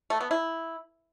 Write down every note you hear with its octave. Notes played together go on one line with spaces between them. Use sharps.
A3
B3
E4